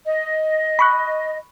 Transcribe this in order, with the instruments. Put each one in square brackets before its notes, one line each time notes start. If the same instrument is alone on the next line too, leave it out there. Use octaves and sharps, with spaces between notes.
[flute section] D#5
[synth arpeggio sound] B5 C#6 F#6